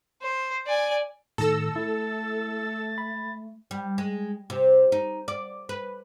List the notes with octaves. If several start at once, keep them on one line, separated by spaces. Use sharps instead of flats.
C5
D5 G#5
A2 D#3 A4 E6 A#6
A3 E4 A6
B5
G3
G#3
C3
D#4
D5
B4